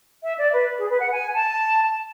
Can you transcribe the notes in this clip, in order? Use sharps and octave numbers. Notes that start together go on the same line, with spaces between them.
E5
D5
B4
G#4
B4
F#5
G#5
A5